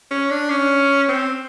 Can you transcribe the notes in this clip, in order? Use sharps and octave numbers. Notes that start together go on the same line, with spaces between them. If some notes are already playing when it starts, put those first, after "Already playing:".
C#4
D4
C#4
C4